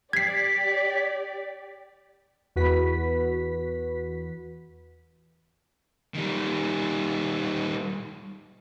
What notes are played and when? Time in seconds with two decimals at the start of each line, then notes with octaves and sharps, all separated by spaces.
0.13 G4 D5 G#6 B6 C7
2.56 E2 F#4 B4 B6
6.15 D#3 G3